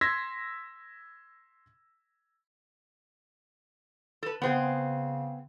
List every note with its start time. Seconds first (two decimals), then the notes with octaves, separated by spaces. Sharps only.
0.01 C6 E6 G#6 A#6 B6
4.23 A4 B4
4.42 C#3 B3 C4 G#4